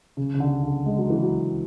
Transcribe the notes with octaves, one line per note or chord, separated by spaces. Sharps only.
C#3
C#3
D3
D3
G#3
F#3
E3
F#3